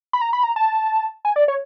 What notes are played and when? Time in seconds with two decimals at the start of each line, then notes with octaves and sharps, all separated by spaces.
0.13 B5
0.22 A#5
0.33 B5
0.43 A#5
0.56 A5
1.25 G#5
1.36 D5
1.48 C#5